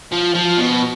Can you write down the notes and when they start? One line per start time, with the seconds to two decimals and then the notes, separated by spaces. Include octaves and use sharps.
0.12 F3
0.35 F3
0.58 B2